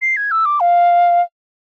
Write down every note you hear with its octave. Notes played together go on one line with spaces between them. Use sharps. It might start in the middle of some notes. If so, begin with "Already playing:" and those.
C7
G#6
E6
D6
F5